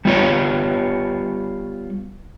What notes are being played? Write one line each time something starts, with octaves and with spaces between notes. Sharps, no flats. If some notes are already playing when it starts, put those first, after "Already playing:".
G3 B3 F4 C#5